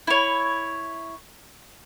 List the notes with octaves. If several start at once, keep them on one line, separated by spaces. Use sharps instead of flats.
E4 C#5